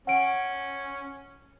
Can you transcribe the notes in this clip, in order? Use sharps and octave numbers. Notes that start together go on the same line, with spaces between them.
C#4 F#5 D7